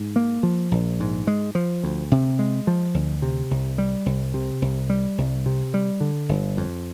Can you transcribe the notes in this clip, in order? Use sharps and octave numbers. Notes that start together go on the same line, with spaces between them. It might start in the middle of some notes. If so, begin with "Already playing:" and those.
Already playing: G#2
A#3
F3
A#1
G#2
G#3
F3
D2
C3
G#3
F3
D2
C3
C2
G3
C2
C3
C2
G3
C2
C3
G3
D3
G1
F2